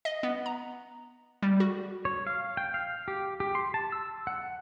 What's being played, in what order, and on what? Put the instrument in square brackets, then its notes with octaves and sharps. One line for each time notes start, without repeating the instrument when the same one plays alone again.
[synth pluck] D#5
B3
A#5
G3
F#4
[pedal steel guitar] C#5
F5
G5
F5
G4
G4
C6
A5
E6
F#5